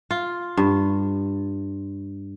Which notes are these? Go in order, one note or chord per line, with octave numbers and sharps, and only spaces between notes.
F4
G2